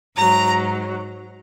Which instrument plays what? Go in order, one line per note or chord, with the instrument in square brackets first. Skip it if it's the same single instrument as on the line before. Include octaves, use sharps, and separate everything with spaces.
[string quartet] G#2 F#3 A#5